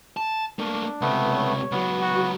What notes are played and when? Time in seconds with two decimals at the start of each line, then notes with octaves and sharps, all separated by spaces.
0.17 A5
0.59 A3 A#3 D4
1.01 C#2 C3 A3 B3
1.31 C#5
1.72 C#2 F#3 B3
2.02 F#4